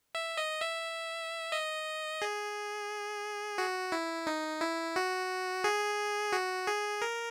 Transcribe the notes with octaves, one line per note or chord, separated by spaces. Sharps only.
E5
D#5
E5
D#5
G#4
F#4
E4
D#4
E4
F#4
G#4
F#4
G#4
A#4